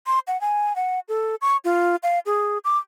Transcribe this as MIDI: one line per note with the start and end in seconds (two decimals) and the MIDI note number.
0.07 0.19 84
0.27 0.39 78
0.41 0.75 80
0.76 0.99 78
1.08 1.35 69
1.41 1.57 85
1.64 1.96 65
2.03 2.19 77
2.26 2.58 68
2.64 2.77 86